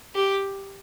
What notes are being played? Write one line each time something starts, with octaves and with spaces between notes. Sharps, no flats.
G4